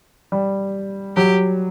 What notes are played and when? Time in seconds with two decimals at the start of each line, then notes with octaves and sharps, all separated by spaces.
0.32 G3
1.16 F#3 G4